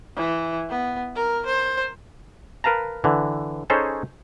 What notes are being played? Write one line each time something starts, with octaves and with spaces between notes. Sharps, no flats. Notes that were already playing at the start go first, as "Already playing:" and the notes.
E3
B3
A#4
C5
A#4 B4 F5 A5 A#5
D3 E3
C#4 D#4 G#4 A4 C5 C#5